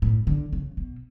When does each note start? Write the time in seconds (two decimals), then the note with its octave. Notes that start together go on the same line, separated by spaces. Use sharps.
0.02 A2
0.27 D3
0.53 C#3
0.77 B2